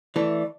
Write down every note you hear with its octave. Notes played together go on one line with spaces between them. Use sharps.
E3 A3 D5